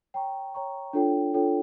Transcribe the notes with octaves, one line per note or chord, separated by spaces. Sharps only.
C#5 G5 A#5 C#6
C#5 G5 A#5 C#6
D4 F4 A4 C#5 G5
D4 F4 A4 C#5 G5